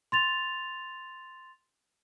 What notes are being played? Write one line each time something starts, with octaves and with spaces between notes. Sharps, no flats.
C6 A6 F7